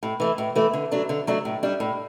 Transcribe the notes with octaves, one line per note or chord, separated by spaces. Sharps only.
A2
E3 A3
A2
E3 A3
D3
F#3 A3 D4
D3
F#3 A3 D4
A2
G3 D4
A2